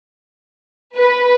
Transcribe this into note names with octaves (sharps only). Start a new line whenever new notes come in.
B4